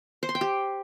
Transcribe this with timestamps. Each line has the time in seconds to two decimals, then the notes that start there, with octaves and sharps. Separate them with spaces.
0.23 C5
0.29 C6
0.35 G5
0.41 G4